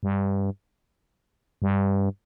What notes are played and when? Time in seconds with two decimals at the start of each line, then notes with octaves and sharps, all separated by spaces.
0.03 G2
1.62 G2